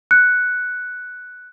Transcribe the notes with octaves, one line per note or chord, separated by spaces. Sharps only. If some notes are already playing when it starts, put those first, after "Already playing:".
F#6 C#7